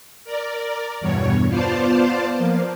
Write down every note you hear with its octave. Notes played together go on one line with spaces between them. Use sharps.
A#4 D5
E2 G2 B2 C#5
B3 F4 C5 D5 F5 A5
F3 A#3